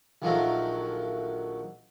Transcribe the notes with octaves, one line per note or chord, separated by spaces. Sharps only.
A#1 D#3 F3 F#3 A3 A#5